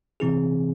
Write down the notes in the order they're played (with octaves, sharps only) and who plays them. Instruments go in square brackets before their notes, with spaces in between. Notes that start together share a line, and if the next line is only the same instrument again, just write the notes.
[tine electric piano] C3 E3 C4 E4 G#4